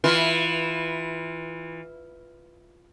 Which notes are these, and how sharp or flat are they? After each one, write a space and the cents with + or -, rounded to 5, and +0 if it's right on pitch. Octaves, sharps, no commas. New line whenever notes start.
E3 -15 F4 +0 B4 +0